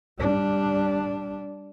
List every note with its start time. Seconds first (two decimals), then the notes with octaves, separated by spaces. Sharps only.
0.18 G3 D4